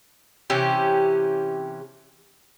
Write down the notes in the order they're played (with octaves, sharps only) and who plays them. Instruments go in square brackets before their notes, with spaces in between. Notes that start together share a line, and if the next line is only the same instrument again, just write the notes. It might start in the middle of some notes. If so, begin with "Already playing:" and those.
[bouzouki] C3 E3 C#4 G4